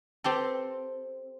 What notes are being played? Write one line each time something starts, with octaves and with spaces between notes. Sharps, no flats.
C4 G4 A4